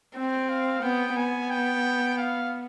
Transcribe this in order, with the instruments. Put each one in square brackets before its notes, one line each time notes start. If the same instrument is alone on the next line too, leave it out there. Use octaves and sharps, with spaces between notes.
[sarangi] C4 [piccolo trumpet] G5
[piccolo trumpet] F5
[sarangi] B3 [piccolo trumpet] G5
[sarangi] B3 [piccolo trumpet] G#5
[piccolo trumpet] G5
F5